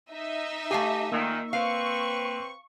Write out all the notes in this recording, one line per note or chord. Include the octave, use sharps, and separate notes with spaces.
D#4 D#5 E5
A3 G4 F5 G#5 D6
A#2 D#3 A#3 E6
C4 B4 F5 C#6